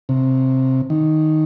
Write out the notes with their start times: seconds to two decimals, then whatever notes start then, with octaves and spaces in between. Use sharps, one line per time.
0.09 C3
0.90 D#3